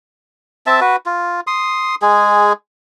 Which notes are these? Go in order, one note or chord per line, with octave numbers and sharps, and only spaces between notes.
C4 E5 A5
F#4 B4
F4
C6 D#6
G#3 G#4